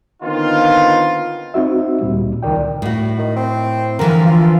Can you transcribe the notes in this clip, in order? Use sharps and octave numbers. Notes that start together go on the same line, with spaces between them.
D3 D#3 B3 C4 D#4 F4
C4 D#4 F#4 E5
D2 A#2 G3
C#2 D#3 A#4 D5 G5
A2 F#4
D#3
C4
D3 E3 F3 A#4
F4